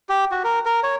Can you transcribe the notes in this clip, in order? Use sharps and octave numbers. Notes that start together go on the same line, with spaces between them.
G4
F#4
A#4
A#4
C#5